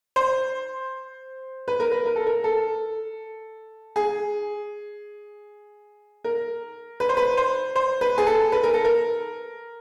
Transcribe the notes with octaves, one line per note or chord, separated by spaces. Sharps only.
C5
B4
A#4
B4
A#4
A4
A#4
A4
G#4
A#4
B4
C5
B4
C5
C5
B4
G#4
A4
B4
A#4
A4
A#4